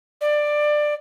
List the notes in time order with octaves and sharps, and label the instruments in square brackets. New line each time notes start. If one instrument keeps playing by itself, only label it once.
[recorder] D5